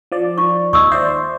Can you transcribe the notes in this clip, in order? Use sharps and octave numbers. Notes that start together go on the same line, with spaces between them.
F3 D5
F4 C#6
D#2 D#4 C#6 D#6 E6 G#6
C5 D5 E5